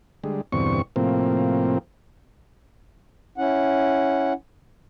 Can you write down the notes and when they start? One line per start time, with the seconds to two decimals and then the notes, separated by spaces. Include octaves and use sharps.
0.24 D3 G3 G#3
0.52 E2 G2 B2 D3 C4 C#6
0.96 A2 C3 F3 A#3 C4
3.38 C#4 E4 F#5